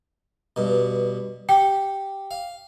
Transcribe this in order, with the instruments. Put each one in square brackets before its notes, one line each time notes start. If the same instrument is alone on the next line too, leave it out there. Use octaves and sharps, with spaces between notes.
[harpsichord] G2 B2
[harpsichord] G4 [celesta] G5
[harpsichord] F5